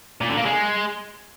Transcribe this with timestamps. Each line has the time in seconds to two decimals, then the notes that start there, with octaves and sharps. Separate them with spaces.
0.21 A#2
0.29 D3
0.37 A#3
0.45 G#3